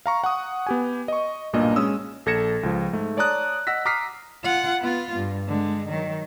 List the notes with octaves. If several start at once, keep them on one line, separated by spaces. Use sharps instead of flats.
F5 A#5 C#6
F#5 C#6 D#6
B3 G4 G#5
D#5 C#6
B1 G2 A#2 A#3 D4 D#5
G#3 C#4 D#6 E6
A#1 A4 G#6 A#6 C#7 E7
C#2 F3
G#2 A3
C#5 D5 A5 A#5 D#6 F#6
D#5 F#5 E6 A#6 B6
A#5 D6 D#6 F6 B6 C7
F4 F#5
B3 F4
G2
D3 G#3
D#3 F#3